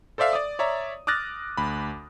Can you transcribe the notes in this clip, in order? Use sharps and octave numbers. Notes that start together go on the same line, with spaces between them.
A4 C5 D5 E5 F5
D5 D#6
C#5 D5 E5 A#5
D6 D#6 F6 F#6 A6 A#6
D2 B5